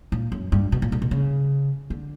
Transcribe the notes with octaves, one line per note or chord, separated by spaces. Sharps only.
A#2
F#2
G2
B2
A#2
A#2
B2
C#3
D3